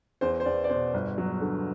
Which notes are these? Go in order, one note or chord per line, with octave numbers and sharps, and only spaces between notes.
E2 C5
C5
E2 D5
D5
B2 C5
G1
F#3
D3